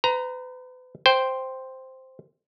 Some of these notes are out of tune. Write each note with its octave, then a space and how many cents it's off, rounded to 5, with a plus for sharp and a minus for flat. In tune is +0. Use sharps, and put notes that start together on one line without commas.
B4 +40 A#5 +0
C5 +0 G5 +0